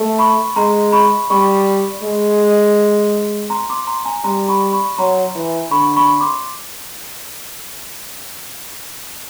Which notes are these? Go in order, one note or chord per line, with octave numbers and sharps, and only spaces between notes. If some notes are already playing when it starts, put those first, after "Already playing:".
Already playing: A3
B5 C#6
G#3 A#5 C6
B5 C#6
G3 B5 C#6
G#3
A#5 C6
C6 D6
A#5 C6
G#5 A#5
G3 A#5 C6
B5 C#6
B5 C#6
F#3 A#5 C6
E3
D3 B5 C#6
B5 C#6
C6 D6